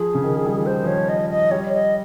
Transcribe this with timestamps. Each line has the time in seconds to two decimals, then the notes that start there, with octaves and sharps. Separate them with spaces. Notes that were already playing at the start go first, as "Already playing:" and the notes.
Already playing: F3 G#4
0.15 C#3
0.23 D#3
0.45 G3
0.58 F3
0.66 D#3 C5
0.84 F3 C#5
1.09 D#5
1.30 D#5
1.51 G3 C#5
1.73 D#5